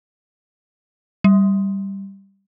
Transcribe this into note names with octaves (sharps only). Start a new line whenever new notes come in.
G3